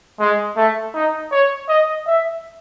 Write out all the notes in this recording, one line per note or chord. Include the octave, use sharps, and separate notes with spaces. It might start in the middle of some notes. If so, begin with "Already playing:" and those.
G#3
A3
D#4
C#5
D#5
E5